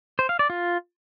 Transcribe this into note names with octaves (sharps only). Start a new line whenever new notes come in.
C5
F5
D5
F4